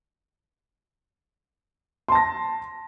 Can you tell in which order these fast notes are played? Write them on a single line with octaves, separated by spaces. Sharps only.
C6 A5 A#6